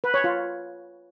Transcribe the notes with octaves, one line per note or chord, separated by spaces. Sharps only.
B4
C#5
F4